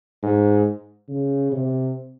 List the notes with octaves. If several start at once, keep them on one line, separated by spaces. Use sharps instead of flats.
G#2
C#3
C3